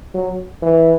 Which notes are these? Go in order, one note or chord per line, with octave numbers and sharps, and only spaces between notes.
F#3
E3